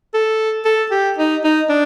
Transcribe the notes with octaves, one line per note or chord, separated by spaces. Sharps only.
A4
A4
G4
D#4
D#4
D4